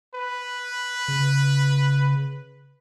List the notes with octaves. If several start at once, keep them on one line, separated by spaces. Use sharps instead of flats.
B4
C#3